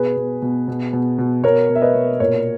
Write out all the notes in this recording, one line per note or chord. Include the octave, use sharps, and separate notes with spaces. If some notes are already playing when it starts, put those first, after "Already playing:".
Already playing: B2 G#4 B4
B2
B2
B2
B2
B2
B2 A#4 C#5
B2
E5
B4 D#5
B2
A#2 A#4 C#5